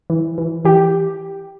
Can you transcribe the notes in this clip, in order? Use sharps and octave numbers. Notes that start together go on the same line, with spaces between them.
E3
E3
E3 G4